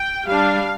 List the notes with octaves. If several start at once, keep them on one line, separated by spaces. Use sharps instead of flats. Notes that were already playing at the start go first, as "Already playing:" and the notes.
Already playing: G5
G3 D4 F5